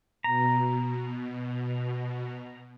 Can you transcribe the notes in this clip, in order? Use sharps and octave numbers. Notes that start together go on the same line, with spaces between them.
B2 A#5